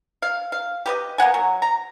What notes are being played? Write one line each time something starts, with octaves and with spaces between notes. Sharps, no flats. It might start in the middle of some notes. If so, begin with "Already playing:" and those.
F5
F5
G4 B4 D#5
A#3 B3 F#5 G#5
F#3
A#5